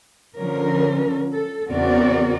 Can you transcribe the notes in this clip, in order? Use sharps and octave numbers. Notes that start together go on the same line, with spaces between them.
D3 F3 C#4 A#4
A4
E2 C#3 C4 F#4 A#4 D5